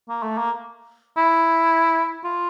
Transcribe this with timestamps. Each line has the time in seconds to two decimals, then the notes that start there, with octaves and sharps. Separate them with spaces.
0.09 A#3
0.23 A3
0.38 A#3
1.17 E4
2.24 F4